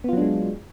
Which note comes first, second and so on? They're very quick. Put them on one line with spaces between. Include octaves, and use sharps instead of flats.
B3 F4 F#3 D4 G#3